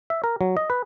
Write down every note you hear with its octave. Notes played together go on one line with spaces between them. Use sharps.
E5
A#4
F#3
D#5
B4